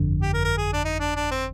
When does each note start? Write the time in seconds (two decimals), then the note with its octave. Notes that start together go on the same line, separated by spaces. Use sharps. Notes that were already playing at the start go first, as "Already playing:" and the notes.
Already playing: G1 F2 D3
0.22 G4
0.34 A#4
0.45 A#4
0.58 G#4
0.73 D4
0.85 D#4
1.00 D4
1.16 D4
1.31 C4